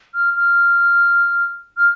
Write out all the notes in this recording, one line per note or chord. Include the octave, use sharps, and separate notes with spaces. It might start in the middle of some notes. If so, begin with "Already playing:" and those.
F6
F6
F6